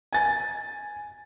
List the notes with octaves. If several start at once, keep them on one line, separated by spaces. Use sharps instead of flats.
G#5 A6